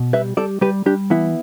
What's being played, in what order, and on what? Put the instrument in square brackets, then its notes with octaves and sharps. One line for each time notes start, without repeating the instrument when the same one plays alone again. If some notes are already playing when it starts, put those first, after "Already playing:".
Already playing: [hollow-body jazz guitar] B2
G3 B4 E5
G3 A4 D5
G3 G4 B4
G3 D4 G4
E3 B3 E4